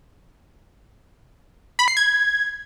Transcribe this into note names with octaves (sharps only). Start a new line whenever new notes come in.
B5
C7
G#6